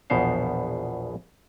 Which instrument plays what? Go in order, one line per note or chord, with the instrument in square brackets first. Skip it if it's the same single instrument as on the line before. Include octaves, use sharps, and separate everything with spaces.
[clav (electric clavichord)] A#1 E2 B2 B3 C5 F5